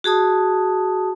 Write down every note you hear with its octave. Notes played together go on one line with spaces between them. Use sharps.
F#4 G#4 A5 D#6